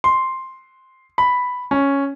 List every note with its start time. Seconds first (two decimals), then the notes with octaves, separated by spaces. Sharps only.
0.04 C6
1.18 B5
1.71 C#4